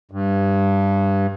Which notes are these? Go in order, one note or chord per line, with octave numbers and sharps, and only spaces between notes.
G2